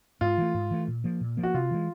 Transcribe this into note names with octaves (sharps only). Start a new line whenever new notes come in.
G#2 F4
E3 A3
G#2
E3 A3
A#2
F3 A#3
A#2
F3 A#3
F#4
C3 F4
E3 G#3